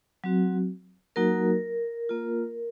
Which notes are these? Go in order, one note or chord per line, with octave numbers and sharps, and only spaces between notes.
F#3 C4 F#4
F#3 A#3 D#4 F#4 A#4
A#3 F4